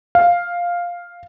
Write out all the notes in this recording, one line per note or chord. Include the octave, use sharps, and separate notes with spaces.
F5